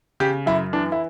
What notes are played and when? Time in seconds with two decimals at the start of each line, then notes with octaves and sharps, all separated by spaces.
0.20 C#3 G4
0.46 F#2 E4
0.73 E3 D4
0.92 E4